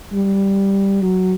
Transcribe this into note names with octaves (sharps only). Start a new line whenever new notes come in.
G3
F#3